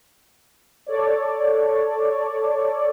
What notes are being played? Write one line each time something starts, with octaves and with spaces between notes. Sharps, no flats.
A4 C#5 D5